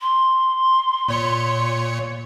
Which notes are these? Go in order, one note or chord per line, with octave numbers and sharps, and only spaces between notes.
C6
A#2 C#5 C#7